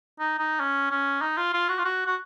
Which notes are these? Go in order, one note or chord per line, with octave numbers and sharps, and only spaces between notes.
D#4
D#4
C#4
C#4
D#4
F4
F4
F#4
F4
F#4
F#4